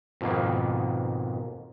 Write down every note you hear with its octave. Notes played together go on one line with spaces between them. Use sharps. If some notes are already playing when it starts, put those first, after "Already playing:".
F2 G#2 B2 D#3 A#3